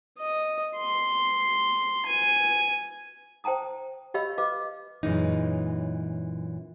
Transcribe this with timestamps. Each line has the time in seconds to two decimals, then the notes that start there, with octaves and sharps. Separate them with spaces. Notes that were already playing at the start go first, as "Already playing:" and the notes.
0.19 D#5
0.77 C6
2.06 G#5
3.44 C5 G5 A5 A#5 D#6
4.14 G4 C#5 D#5 F5 B5 E6
4.38 B4 D#5 F5 D6
5.03 F#2 A#2 E3 G#3 C#4 D#4